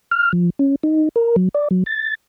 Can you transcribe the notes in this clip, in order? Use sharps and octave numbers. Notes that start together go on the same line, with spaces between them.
F6
F3
C#4
D#4
A#4
F#3
D5
F#3
A6